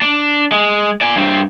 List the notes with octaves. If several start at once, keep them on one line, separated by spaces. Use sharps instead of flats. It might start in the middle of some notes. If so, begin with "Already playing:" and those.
D4
G#3
D5 G#5
G2 C4